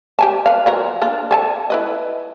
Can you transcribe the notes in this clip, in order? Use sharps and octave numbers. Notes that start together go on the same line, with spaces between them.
G4 G#5 A5
B4 F5
F3 F#3 A#4
A#3 D4 F4
A4 G#5 A5
E4 B4 D#5